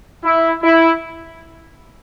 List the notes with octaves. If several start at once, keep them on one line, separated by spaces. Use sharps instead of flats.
E4
E4